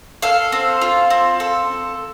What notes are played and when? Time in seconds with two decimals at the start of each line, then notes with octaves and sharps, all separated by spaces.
0.22 A4 F5
0.52 C4
0.81 F4
1.10 C4
1.40 A4